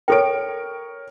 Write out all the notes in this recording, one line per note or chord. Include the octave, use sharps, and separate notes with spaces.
A4 A#4 C#5 G5 D7